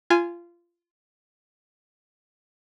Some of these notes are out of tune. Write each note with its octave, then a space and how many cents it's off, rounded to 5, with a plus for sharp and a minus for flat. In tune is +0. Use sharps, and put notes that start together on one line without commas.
F4 -20 G#5 +0